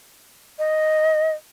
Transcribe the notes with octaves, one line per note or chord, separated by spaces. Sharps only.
D#5